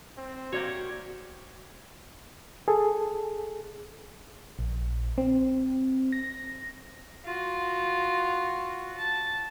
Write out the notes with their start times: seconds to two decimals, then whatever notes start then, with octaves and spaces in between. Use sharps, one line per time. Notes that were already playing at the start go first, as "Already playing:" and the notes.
0.18 C4
0.52 A#3 F#4 G4 C#5 D5 G#6
2.68 G#4 A4
4.59 A#1
5.18 C4
6.12 A#6
7.25 F4 F#4
8.98 A5